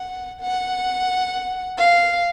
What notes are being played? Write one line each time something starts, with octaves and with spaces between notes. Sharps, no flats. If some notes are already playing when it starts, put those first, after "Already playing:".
Already playing: F#5
F#5
F5